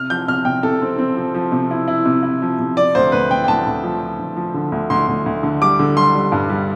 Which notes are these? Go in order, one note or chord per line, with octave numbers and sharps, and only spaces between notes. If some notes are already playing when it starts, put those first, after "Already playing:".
Already playing: C3 F6
F3 G6
C3 F6
C3 G5
C3 A4
C4
C4
F3
F3
C3
E4
E4
C3
E4
F3
C3
F3 D5
D2 C5
D2 B4
D2 G5
G5
D2 A5
D2
F3
F3
D2
F3
D3
D2
D2 C6
D2
D2
D3
G3 D6
D3
G3 C6
G3
G2
G3